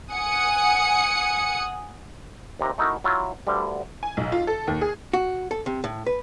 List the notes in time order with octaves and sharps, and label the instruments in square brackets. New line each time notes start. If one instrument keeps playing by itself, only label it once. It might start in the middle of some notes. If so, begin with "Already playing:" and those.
[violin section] F#5 G#5 D#6 C#7
[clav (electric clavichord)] D#2 C3 A#5
A3 D#4 E4 F#4 A#4
F#3 E4 F4
D2 G2 D3 G3
[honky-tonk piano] G#5
B1
F4
A4
D#2
G#4
[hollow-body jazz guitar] F#4
A4
C3
A2
B4